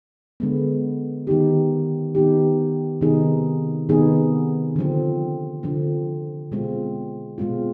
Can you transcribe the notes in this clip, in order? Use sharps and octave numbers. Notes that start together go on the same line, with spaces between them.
D3 G#3 B3
D#3 B3 D#4 G4
D#3 B3 D#4 G4
C3 D#3 B3 D#4 G#4
C3 D#3 B3 D#4 G#4
D3 F3 C4
D3 F3 C4
B2 G#3 C4 F4
B2 G#3 C4 F4